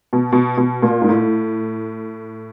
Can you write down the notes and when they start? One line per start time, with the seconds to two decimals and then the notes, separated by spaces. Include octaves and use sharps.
0.13 B2
0.32 B2
0.57 B2
0.83 A#2
1.02 G#2
1.09 A2